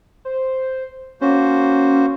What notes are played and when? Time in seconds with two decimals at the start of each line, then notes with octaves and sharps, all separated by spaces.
0.25 C5
1.21 A#3 C#4 F#4 C5